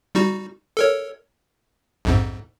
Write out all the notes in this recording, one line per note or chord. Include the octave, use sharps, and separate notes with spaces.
G3 D#4 F#4
A4 A#4 C#5
A#1 F2 G#2